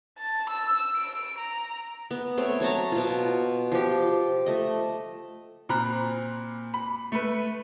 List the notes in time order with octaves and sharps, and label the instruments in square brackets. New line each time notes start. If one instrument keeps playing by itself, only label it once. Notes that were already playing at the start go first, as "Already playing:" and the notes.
[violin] A5
E6
D7
A#5
[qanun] B3
A3 C4 C#5
F#3 C#5 A5 A#5
B2 F4
F3 G4
A3 D#5
[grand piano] A#2 C4 A#5 B5 F#6
B5
A3 B4